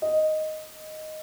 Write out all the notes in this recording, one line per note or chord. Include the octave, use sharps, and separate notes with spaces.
D#5